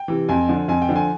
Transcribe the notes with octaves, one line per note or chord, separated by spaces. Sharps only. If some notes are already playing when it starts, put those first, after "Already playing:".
Already playing: G5
C3 E3
F2 G#5
D3 F3
F2 G#5
G5
D3 F3
G#5